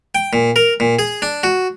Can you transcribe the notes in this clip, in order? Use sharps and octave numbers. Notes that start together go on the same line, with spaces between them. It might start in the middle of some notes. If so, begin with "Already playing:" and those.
G5
A#2
A#4
A#2
G#4
D4
F#4